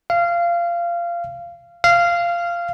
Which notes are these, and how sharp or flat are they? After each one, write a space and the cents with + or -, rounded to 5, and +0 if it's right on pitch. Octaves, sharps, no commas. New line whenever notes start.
F5 -20
F5 -15